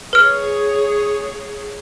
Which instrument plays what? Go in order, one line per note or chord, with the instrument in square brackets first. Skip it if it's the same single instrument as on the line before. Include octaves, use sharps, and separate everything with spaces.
[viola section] G#4 C#5 [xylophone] B4 F6